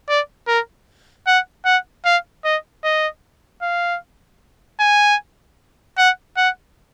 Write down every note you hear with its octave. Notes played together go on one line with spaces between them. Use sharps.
D5
A#4
F#5
F#5
F5
D#5
D#5
F5
G#5
F#5
F#5